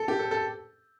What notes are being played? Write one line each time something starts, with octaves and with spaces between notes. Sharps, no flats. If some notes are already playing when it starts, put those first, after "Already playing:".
Already playing: A4
G4
A4
A4